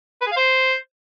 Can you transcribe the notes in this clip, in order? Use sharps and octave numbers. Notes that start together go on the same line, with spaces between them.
B4
G#4
F5
C5